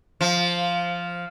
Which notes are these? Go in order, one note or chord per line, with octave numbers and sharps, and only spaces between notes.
F3